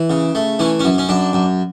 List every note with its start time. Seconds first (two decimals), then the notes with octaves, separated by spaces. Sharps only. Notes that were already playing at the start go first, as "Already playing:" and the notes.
Already playing: E3
0.10 C#3
0.35 A3
0.59 E3 C#4
0.80 C#4
0.85 F#2
0.98 C#4
1.09 F#2 D4
1.33 F#2